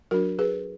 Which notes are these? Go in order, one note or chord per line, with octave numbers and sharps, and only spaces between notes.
F#3 D4 F#4 A#4
G#4 B4